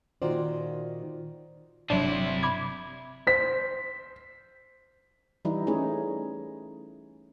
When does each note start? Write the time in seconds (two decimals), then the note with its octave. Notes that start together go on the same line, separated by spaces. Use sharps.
0.22 A#2 D#3 F4 F#4 C5 D5
1.90 G1 C3 F#3 D4 E4 C#5
2.43 B5 D6 G#6
3.27 C5 B6
5.45 E3 G3 D#4 E4
5.67 A3 C#4 D#4 G#4 C#5